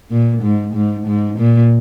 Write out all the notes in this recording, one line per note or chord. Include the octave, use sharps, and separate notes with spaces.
A#2
G#2
G#2
G#2
A#2